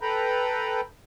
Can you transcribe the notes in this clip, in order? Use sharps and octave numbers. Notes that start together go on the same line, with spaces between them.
A4 B4 G5 A#5 B5